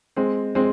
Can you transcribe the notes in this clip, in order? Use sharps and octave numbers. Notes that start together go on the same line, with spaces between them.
G#3 C4
G#3 C4